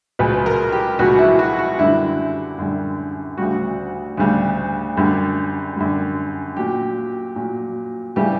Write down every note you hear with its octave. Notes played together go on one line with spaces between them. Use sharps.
C#2 B2 F#3 B4
A#4
G4
C#2 B2 F#3 F#4
E4
F#4
F#4
F#2 D3 G3 E4
F#2 D3 G3
D2 C#3 G3 F#4
D2 C#3 G3
F#2 D3 G3
F#2 D3 G3
A#2 F#3 G4
A#2 F#3
C#3 E3 G3 G4